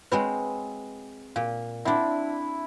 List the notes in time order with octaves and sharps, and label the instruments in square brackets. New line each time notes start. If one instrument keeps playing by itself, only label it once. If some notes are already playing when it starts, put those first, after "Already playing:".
[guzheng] G#3 C4 F#4 [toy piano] B4 C#5 B5
[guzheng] A#2 [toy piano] F5
[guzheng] C4 D4 [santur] E4 [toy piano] F#5